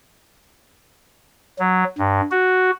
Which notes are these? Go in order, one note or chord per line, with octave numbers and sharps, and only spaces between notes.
F#3
G2
F#4